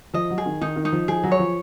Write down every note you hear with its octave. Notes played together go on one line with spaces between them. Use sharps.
F3 D#5
F#3
G#4
D#3
D#3 D#4
D#3
D#4
F3
F3 G#4
F#3
C#5
F3